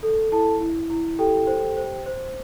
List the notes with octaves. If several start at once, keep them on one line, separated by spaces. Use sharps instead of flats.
A4
E4 A4 A5
E4
E4
G4 A4 G5
C5
C5
C5